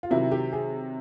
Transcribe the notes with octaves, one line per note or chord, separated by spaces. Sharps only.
F4
C3 D#3 F#3 E4
G4
G#4